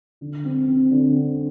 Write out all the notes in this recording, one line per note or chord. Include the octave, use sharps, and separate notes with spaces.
D3
C4
C4
D3
C4